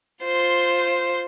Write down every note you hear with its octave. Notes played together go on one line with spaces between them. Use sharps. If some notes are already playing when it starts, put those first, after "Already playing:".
F4 C5